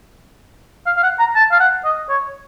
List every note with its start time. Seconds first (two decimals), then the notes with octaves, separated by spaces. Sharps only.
0.86 F5
0.97 F5
1.03 F#5
1.19 A#5
1.36 A5
1.52 F5
1.60 F#5
1.85 D#5
2.09 C#5